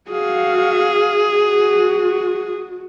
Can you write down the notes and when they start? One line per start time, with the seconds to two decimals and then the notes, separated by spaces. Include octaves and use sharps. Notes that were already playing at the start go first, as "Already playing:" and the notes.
0.10 F#4 G#4 F5
1.32 F#4